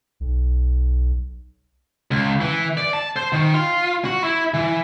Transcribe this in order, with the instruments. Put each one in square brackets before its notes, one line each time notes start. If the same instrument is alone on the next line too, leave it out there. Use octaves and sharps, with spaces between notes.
[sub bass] B1
[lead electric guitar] C#2
E3
D5
A5
C5
D#3
F4
F#4
E4
E3